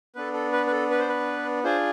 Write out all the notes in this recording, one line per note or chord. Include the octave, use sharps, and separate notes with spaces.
B3 D4 A4 B4
A4
B4
B4
A4
B4
C5
B4
D4 F4 G#4 C5